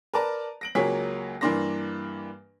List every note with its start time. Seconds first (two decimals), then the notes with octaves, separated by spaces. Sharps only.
0.14 A#4 B4 D5 A5 A#5
0.61 A#6 D7 F#7
0.75 C#2 F#3 A#3 G#4 C#5 B6
1.41 G2 E3 A#3 D4 C6 A#6